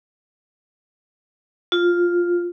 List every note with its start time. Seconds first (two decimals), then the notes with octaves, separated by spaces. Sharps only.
1.72 F4